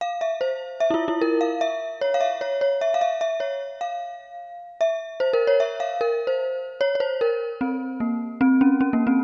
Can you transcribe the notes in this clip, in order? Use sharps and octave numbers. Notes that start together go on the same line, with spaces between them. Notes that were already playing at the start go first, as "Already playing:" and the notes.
F5
E5
C5
E5
E4
F4
E4
A#4
F5
E5
C#5
F5
E5
C#5
C#5
E5
F5
E5
E5
C#5
F5
E5
C5
A#4
C#5
E5
F5
A#4
C5
C#5
C#5
C5
A#4
C4
A#3
C4
C#4
C#4
A#3
C4